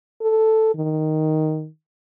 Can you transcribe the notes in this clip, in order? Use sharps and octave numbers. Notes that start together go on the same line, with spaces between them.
A4
D#3